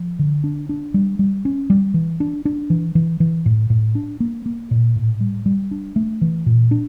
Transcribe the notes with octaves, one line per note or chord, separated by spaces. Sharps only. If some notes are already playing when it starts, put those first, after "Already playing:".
Already playing: F3
D3
D4
D4
G3
G3
C#4
G3
E3
D4
D4
E3
E3
E3
A2
A2
D4
A#3
A#3
A#2
A2
G3
G3
D4
A3
E3
A#2
D4